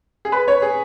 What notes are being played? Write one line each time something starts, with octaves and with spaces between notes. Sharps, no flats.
G#4
B4
C#5
G#4